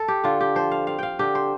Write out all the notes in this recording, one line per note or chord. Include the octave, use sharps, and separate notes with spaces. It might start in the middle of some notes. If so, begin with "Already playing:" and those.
Already playing: A4
G4
D3 F4
G4
F3 C5
F5
C4 F5
F5 G5
D3 G4
C5